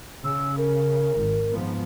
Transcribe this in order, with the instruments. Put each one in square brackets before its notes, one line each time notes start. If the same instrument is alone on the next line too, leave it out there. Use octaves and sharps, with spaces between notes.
[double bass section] C#3 [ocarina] E6
[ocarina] A#4
[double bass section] G#1
G#2 F3 B3